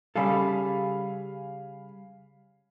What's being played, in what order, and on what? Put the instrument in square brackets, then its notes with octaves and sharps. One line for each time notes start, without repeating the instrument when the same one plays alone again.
[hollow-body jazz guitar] C#3 G3 A4 [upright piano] F5 G#5 B5